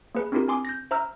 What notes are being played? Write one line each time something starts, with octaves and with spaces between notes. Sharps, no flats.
A#3 G#4 B4
C4 D4 E4 F4 G4 A#4
C4 G#5 C6 D6 D#6
G6 A#6
C5 E5 A#5 E6 F6